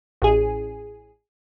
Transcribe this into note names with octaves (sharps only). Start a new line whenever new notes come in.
A1 G#4